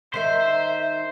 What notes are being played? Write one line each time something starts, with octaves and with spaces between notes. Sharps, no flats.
D#3 D#4 A#4 C5 E5